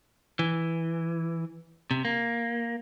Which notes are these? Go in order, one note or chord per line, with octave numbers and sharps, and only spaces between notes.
E3
C3
A#3